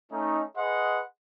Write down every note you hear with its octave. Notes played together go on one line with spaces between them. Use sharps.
A3 C#4 D#4
G#4 B4 D#5 F#5 C6